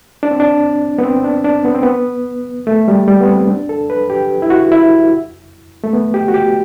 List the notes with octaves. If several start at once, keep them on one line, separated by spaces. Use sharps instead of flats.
D4
C4
D4
B3
C4
D4
D4
B3
C4
B3
A3
G3
G3
B3
C4
D4
A4
B4
G4
E4
F#4
E4
A3
B3
G4
F#4
G4